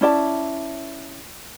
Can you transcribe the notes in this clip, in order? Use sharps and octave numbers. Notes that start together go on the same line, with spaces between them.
C#4 E4 D5 A5